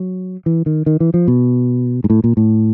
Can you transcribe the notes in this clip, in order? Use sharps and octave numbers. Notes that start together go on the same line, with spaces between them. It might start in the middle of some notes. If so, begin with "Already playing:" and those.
Already playing: F#3
E3
D#3
D#3
E3
F3
B2
G#2
A2
A#2
A2